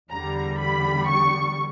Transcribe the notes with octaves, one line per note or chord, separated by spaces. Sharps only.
E2 D3 G3 A#5
B5
C#6